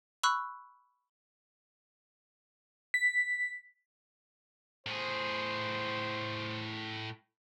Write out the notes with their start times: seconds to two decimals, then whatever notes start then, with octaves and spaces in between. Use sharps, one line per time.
0.23 B5 C#6 E6 F#6
2.94 B6
4.86 A2 G#4 C5